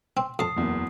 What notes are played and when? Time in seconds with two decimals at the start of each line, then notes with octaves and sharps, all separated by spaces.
0.17 C4
0.39 F2 A5 D#6 C7
0.56 F#1 E2 A#3